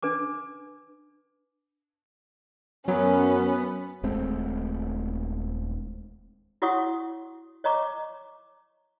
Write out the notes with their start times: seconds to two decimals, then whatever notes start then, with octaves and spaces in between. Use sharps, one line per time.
0.03 D4 B4 G#5 D6
2.88 F#2 F#3 B3 C#4
4.03 D#1 G#3 A3 C4
6.62 E4 F#4 C#5 F#5 C#6 D#6
7.64 C#5 D#5 A#5 C#6 D6